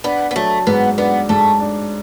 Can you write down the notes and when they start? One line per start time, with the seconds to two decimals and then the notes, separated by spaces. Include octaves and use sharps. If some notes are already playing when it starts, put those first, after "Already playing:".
0.04 B3 D4
0.31 B3
0.35 F#3 A3
0.67 G#2 B3
0.97 B3 D4
1.29 G#2 A3
1.60 D4